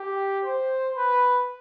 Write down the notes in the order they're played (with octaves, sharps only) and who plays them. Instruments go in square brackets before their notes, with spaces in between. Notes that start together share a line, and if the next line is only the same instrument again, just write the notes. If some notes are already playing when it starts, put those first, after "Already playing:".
Already playing: [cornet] G4
C5
B4